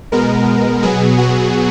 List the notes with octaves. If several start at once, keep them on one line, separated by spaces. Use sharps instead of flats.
B2 G#3 B3 A#4
B2 F#3 B3 G#4
F#4